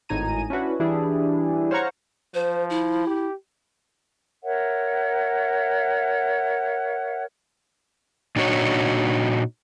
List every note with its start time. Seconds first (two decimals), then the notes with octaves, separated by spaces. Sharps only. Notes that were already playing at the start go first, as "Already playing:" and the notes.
0.09 G#1 A2 D#4 G#5 A#5 D#7
0.50 C#4 D4 E4 F#4 B4
0.80 E3 G3 D4 E4 G#4
1.71 C5 C#5 F5 F#5 A#5 C#6
2.34 F3 C5
2.70 E4
3.07 G4
4.43 A#4 C#5 E5 F#5
8.36 A#2 D4 D#4 F#4 A#4 C#5